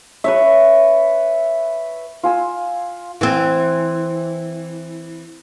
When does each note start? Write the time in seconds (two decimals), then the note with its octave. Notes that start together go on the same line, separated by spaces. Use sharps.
0.24 B4 C#5 E5
2.24 F4 G#5 E6
3.21 E3 C4